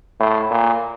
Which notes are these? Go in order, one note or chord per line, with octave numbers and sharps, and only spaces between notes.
A2
A#2